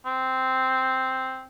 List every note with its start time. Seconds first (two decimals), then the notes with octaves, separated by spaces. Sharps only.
0.05 C4